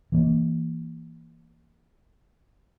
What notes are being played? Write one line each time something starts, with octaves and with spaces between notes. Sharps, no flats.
E3 A#3